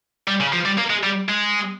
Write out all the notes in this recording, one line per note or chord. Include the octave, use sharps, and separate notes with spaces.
G3
C#3
F3
G3
A#3
G#3
G3
G#3